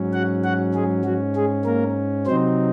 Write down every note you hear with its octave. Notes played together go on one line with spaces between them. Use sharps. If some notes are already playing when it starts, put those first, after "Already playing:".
Already playing: G#2 F#3 C#4
F#4 F#5
F#4 F#5
G#3 G#4
F#3 F#4
G#3 G#4
A#3 A#4
C3 F#3 C4 D#4 C5